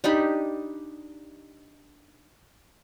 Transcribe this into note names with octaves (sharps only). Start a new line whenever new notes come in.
D4 D#4 G4 B5